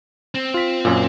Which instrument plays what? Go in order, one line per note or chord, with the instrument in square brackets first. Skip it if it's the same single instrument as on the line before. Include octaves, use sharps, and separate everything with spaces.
[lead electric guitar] C4
[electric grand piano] F4 B6
F#2 A#2